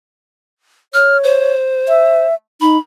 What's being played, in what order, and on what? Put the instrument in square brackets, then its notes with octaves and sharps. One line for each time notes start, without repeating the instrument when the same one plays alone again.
[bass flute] C#5 [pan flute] F6
[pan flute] C5
[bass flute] E5
[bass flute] D#4 [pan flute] B5